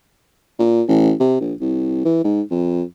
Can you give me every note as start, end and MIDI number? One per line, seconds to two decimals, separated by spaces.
0.59 0.82 46
0.88 1.12 33
1.20 1.36 48
1.40 1.53 34
1.61 2.03 36
2.05 2.19 52
2.24 2.42 44
2.51 2.83 41